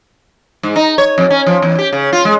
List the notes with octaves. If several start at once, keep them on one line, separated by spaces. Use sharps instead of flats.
G#2
D#4
C#5
F2
C#4
F3
E2
G4
C#3
F4
G#3